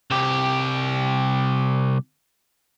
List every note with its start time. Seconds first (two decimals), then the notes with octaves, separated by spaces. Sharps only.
0.11 C2 G4